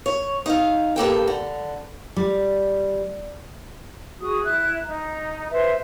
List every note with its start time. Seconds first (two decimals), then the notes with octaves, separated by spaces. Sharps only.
0.06 C#5
0.46 D#4 F5
0.96 G2 A#3 A4 G5
1.27 D3
2.16 G3
4.20 F#4 G#4 D#6
4.44 E4 F#6
4.86 D#4 A#5
5.51 B4 C5 E5